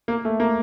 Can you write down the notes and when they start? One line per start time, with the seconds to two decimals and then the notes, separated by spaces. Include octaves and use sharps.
0.08 A#3
0.25 A3
0.40 A#3